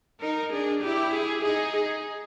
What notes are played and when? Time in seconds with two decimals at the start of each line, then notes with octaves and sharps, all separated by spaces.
0.21 D#4 A#4
0.52 D4 G#4
0.83 E4 G4
1.13 G#4
1.44 D#4 G#4
1.76 G#4